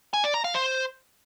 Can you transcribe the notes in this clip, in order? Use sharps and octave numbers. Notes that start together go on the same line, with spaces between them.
G#5
D5
A#5
F5
C5